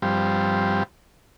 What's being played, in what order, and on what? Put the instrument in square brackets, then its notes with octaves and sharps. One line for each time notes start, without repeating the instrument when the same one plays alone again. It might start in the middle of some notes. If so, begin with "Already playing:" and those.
[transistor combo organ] G2 F3 G3 C4